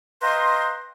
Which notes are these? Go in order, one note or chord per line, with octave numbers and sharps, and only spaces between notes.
B4 D#5 F5 G5 A#5 C6